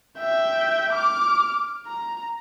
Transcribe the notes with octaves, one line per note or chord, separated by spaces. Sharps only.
E5 G5
D6 F6
A#5